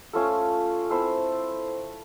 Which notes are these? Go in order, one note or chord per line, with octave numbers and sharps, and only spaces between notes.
A3 C#4 F4 A4
C4 E4 A4 C5